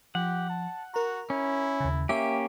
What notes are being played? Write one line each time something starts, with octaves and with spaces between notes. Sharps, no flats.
F3 G4 F#5
A5
F#4 A#4 A#5
C#4 E4
D#2 C#3
A#3 C#4 G4 E5 G5